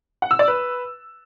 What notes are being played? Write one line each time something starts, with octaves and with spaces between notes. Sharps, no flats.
F#5
E6
D5
B4